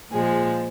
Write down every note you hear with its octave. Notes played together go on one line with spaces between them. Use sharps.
A#2 F3 G#3 G#4